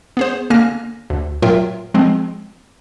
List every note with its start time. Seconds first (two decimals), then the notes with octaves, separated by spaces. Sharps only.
0.17 B3 G#4 C5
0.50 D3 A#3 G#5 F6 A#6
1.10 D2
1.42 A#2 F#3 F4 A#4 E5 G5
1.94 F3 G#3 C4